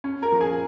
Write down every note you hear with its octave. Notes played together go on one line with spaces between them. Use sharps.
C#4
A#4 A#5
F3
G#4 G#5